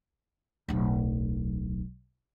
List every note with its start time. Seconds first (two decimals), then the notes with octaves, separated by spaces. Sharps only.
0.69 D1 B1